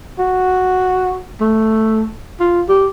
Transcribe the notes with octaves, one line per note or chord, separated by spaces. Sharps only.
F#4
A3
F4
G4